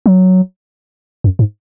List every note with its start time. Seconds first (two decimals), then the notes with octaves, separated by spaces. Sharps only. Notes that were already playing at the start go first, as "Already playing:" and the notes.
0.06 F#3
1.24 F#2
1.39 G#2